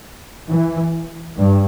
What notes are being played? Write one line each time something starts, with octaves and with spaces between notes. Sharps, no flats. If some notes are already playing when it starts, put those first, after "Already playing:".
E3
G2